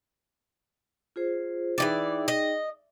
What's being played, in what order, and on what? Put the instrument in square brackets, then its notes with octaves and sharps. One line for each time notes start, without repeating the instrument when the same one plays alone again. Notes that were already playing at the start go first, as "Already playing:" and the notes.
[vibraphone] F4 G#4 C5
[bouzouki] E3 G#3 D5 [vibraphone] D#4 G#4 G5
[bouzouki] D#5